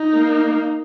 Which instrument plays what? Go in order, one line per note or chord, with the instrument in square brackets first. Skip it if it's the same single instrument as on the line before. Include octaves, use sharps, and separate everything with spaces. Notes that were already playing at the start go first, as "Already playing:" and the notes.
Already playing: [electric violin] D#4
[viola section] A#3